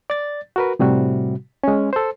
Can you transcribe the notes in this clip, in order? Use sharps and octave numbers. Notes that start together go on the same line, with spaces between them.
D5 A6
F#4 A#4 B4
A2 C3 G3 F#4
G#3 C#4
A4 C5